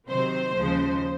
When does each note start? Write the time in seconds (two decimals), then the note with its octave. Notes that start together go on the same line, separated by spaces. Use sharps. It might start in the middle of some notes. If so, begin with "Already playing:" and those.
0.08 C3 D#3 F#3 C4 C5
0.56 D#2 C#3 F3 G#3